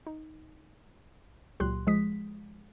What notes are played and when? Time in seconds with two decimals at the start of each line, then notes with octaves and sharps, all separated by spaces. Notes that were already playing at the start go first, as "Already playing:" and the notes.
0.07 D#4
1.60 C#2 A#2 F#3 G4 C6 F#6
1.87 F3 G#3 D#6 B6